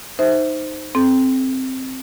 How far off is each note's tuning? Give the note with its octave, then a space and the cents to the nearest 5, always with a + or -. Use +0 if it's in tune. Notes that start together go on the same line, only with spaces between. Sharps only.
D#4 +0 C5 +0 E5 -15
C4 +0 A4 -40